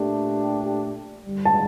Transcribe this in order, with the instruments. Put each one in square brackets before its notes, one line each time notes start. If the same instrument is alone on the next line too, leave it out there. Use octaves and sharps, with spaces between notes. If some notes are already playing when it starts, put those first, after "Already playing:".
Already playing: [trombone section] A#2 A3 D4 G4
G2 D3 G3
[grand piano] A5